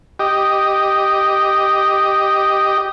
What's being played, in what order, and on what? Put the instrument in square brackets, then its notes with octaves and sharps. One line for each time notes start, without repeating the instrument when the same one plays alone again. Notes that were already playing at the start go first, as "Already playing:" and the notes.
[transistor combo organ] G4 D#5